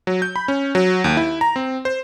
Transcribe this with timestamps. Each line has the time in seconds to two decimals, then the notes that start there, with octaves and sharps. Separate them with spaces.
0.07 F#3
0.22 G6
0.36 B5
0.48 C#4
0.75 F#3
1.04 D#2
1.17 E4
1.41 A#5
1.56 C4
1.85 C5